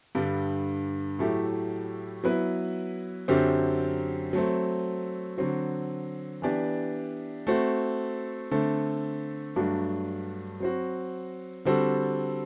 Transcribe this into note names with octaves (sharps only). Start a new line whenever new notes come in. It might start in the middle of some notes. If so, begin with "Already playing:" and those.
G2 D3 G3
A2 F#3 A3 E4 G4
F#3 B3 E4 B4
F#2 D3 F#3 C4 G4
F#3 A3 C4
D3 F#3 C4 F#4
E3 B3 D4 G4 D5
A3 C4 F#4
D3 A3 C4
G2 F#3 A3 D4 F#4
F#3 C4 F#4
D3 G3 C4 F#4 A4